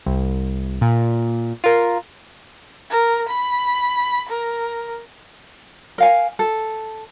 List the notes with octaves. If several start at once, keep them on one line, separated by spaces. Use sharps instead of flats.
C2
A#2
F4 A#4
A#4
B5
A#4
A#4 F5 G#5
A4